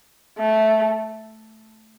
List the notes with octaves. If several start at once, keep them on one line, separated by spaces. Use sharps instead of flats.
A3